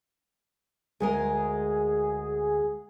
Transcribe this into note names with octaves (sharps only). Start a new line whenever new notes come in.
D2 G#3 G#4 A#4